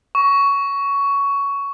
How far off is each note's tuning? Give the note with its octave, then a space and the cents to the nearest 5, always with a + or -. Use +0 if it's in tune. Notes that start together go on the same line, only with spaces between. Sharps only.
C#6 +15